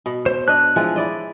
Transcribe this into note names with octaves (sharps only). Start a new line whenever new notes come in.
B2
C5
D4 D#5 F#6
E3 F3 G#3
E4 D5 D#5